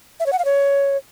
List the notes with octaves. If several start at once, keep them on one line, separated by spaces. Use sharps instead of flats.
E5
C#5
F#5
F5
C#5